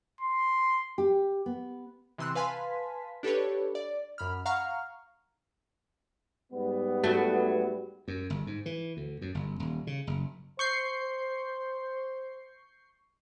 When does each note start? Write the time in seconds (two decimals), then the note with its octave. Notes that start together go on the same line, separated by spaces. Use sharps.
0.21 C6
0.98 G4
1.46 B3
2.18 C3 E3 C6 E6 F#6
2.35 B4 F5 G#5 A5 C6 B6
3.23 D4 G4 A4 B4 C#5
3.75 D5
4.18 F#2 B5 F6
4.46 F5 F#5 A#5 C#6 F6
6.52 G#2 G3 B3
7.04 F#3 A3
8.08 F#2
8.30 G1
8.47 G#2
8.66 E3
8.97 D2
9.22 F#2
9.35 G1
9.60 D#1
9.87 C#3
10.07 F#1
10.59 C5 C#6 G6 C7